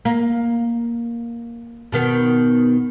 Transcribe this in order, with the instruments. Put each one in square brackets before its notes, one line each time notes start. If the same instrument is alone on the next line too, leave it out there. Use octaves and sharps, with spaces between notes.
[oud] A#3
B2 D#3 B3